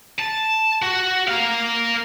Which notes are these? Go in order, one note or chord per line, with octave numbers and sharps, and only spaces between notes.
A5
F#4
A#4 F5